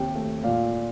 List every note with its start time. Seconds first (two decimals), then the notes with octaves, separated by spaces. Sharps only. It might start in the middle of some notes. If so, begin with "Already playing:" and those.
Already playing: D#2 C3 G5
0.15 A3
0.43 A#2 F5